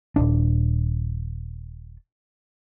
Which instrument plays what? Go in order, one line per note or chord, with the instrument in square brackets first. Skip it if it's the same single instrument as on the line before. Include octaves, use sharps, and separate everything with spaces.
[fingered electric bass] D#1 G#1 D4